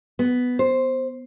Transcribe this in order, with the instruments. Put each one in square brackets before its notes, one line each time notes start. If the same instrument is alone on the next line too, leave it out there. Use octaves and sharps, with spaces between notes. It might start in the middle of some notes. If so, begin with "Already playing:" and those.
[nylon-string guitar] B3
C5